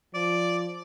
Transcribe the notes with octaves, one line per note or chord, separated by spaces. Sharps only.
F3 D5